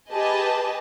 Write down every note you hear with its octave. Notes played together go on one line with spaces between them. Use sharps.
G4 G#4 B4 D#5 A5